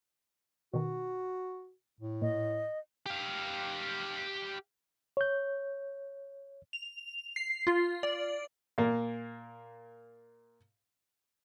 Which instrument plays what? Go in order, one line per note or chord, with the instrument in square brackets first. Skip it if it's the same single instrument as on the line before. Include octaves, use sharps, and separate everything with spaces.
[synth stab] B2 D#3 [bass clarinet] F#4
[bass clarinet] A2
[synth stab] A#2 [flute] D#5
[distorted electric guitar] G4 F5
[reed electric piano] C#5 G6
[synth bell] F7
C7
F4
D5
[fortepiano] A#2 A#3